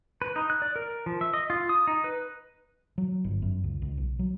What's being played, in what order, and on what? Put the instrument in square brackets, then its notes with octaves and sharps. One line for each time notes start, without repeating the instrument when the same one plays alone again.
[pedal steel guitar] B4
D#4
F#6
D5
A#4
F3
E5
D#5
F4
D#6
D#4
B4
[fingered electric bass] F#3
G1
F#2
C#2
C#2
B1
F#3